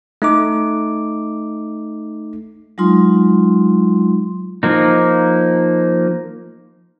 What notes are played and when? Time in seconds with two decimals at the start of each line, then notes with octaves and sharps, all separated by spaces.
0.22 A3 D#4 D6
2.78 F#3 G#3 D#4 F4 C6
4.63 F3 A#3 D#4